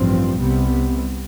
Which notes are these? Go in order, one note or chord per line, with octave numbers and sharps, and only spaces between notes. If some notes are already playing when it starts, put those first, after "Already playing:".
Already playing: A1 G2 F3 C4
C2 C3 G3 B3